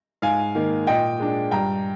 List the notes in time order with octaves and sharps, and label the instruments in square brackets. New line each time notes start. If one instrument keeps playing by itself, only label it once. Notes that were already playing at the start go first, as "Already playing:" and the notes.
[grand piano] G#2 F5 G#5
D#3 A#3
A#2 D#5 G5
G#3 D4
G2 G5 A#5